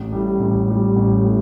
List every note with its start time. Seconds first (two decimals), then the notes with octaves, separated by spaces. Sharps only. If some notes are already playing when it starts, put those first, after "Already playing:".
Already playing: A1
0.12 A2 G3
0.40 A1
0.68 A2 G3
0.96 A1
1.24 A2